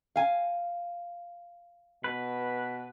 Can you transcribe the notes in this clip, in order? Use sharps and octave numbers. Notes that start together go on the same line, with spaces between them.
F5 G#5
B2 B4